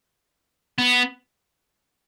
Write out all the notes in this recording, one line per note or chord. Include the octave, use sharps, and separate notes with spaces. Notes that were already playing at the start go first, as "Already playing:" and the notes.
B3